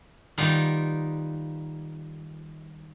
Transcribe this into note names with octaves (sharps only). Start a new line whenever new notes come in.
D#3 G3 B3 D#4 F4 A#4